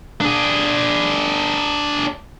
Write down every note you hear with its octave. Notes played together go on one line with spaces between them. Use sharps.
D4 G#4